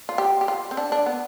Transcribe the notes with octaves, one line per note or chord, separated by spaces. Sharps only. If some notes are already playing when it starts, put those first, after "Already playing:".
F4
G4
G4
F4
C4
D4
D4
B3